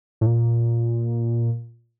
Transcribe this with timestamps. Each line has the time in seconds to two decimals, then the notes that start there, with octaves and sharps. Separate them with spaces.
0.21 A2
0.26 A#2